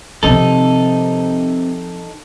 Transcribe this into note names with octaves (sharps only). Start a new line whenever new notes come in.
C3 D#3 F3 C4 D#4 A4